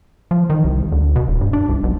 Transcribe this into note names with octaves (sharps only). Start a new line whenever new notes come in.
F3
D#3
C2
D2
B2
D1
G2
D4
C2
B1